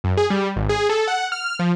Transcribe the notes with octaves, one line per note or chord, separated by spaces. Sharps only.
F#2
G#4
G3
G#1
G#4
A4
F#5
F6
F3